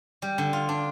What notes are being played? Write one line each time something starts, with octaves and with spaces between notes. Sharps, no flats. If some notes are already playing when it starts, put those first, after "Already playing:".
G3
D3
F4
D4